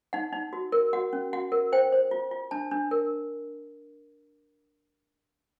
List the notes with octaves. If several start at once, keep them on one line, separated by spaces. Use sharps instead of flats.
D#4 F#5
D#4
F#4
A#4
F#4 F#5
C#4
F#4 F#5
A#4
C5 G5
C5
F4
F4
D4 A5
D4
A#4